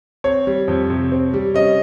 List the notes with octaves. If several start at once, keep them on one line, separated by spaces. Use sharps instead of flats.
C4 C#5
G3
F2
C3
C4
G3
C#4 D#5